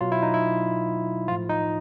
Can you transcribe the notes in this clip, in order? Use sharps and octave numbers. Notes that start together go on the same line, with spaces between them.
B2 F#3 F4
E4
D#4
E4
A2 F3 F4
D#4